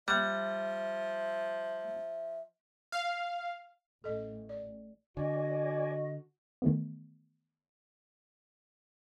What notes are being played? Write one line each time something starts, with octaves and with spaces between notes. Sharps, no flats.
F3 G3 E5 F#5
F5
A1 A4 D#5
D5
D3 F#4 D5 D#5 G#5
D#3 E3 A3 B3